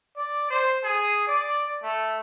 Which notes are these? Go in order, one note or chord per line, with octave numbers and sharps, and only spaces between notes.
D5
C5
G#4
D5
A3